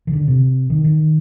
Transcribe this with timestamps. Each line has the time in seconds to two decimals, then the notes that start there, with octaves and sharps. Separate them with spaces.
0.07 D#3
0.13 D3
0.28 C3
0.70 D#3
0.84 D#3